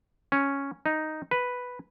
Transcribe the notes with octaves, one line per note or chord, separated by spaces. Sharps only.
C#4
D#4
B4